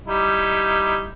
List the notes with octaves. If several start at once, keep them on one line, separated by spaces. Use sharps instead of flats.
G3 D#4 E4